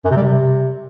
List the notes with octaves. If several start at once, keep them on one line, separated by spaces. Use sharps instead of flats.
F#2
C3
G3
C3